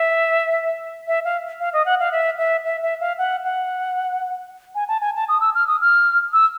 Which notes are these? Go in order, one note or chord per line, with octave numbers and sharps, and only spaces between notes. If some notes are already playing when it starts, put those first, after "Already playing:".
Already playing: E5
E5
F5
F5
D#5
F#5
F5
E5
E5
E5
E5
F5
F#5
F#5
G#5
A5
G#5
A5
D#6
E6
F6
D#6
F6
E6